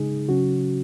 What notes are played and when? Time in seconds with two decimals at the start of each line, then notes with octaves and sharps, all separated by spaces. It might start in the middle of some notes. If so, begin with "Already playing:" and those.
Already playing: C#3 G#3 D#4 G#4
0.28 C#3 F#3 C#4 F#4